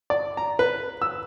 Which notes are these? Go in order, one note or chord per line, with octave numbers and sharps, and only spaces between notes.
D5
A#5
B4
E6